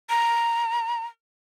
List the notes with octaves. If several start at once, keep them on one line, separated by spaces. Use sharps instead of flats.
A#5